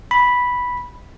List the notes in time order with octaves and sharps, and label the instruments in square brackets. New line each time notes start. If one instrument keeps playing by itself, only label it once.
[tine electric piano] B5